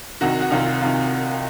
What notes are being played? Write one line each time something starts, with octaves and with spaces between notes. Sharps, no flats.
C2 C3 D#3 F#4
F#4
C2 C3 D#3 F4
F4
C3 D#3 F4